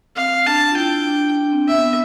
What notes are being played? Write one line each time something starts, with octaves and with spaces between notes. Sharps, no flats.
C4 F5
D4 A5
F4
E4 G5
D4
D4
C4
B3 E5
B3